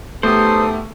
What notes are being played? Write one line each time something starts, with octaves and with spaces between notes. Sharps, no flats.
E2 A3 B3 D#4 G4 A4 C5 D#6